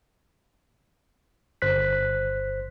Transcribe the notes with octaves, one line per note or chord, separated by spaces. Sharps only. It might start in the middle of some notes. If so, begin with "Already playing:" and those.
G1 C5 F#6 B6